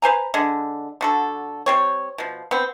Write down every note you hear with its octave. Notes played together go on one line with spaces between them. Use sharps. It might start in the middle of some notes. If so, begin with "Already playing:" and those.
B4 C5 G#5 A#5
D3 G#3
D3 F#4 A4
G3 C4 C#5
B2 F3
B3 C4